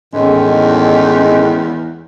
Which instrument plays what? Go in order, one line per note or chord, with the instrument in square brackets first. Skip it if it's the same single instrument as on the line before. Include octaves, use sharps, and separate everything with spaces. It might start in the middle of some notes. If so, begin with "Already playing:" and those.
[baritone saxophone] E2 [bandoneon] A2 D#3 [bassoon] G#3 [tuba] C#4